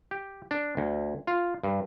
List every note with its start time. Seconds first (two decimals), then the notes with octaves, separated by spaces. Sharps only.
0.11 G4
0.51 D4
0.77 D2
1.27 F4
1.64 G2